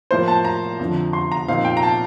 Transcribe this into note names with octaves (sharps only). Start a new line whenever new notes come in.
A2 F3 A#3 C5
A5
A#5
F2 D3 F3
C6
A#5
A#2 F3 C4 D#4 F5
G5
A#5
A5